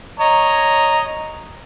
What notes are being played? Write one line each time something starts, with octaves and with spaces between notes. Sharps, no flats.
C#5 D#5 A#5